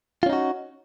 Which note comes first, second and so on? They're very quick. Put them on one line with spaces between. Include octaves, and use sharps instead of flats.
F4 C#4 D#4 F#4